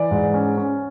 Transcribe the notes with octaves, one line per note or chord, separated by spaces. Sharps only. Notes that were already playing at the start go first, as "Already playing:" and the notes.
Already playing: E3 D5
G#2
C#4
C#4